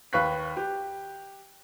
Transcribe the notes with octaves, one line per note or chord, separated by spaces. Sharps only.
D#2 B4 F5 C#6 F#6 B6
G4